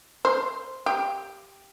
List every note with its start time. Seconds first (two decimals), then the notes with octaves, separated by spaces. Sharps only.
0.25 C5
0.86 G4